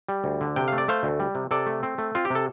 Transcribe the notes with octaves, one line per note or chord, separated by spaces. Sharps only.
G3
D2
D3
C3 G5
A3 F5
D5
A3 C5 F5
D2
G3
C3
C3 A4 D5
A3
C4
A3
C4 F4
G4
C3 A4